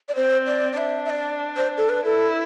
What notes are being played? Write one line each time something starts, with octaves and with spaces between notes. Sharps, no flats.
D5
C4 C5
D5
D5
D4 E5
E5
D5
C5
A4
B4
E4 A4